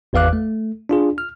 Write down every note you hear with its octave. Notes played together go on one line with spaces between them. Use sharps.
G#1 E2 B4 F5 D6 F#6
A3
D4 F4 G#4
F6